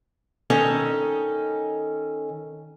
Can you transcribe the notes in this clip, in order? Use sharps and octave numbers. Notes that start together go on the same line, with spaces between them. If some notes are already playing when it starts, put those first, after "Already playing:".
D#3 C#4 A4 D#5